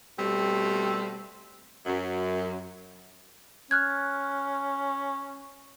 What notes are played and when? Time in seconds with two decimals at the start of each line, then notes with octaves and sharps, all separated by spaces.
0.19 B2 G3 A3 C4
1.86 F#2
3.71 C#4 F6 F#6 G#6